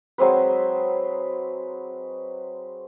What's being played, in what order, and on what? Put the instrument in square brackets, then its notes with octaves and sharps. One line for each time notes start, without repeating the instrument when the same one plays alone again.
[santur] F#3 G#3 C4 B4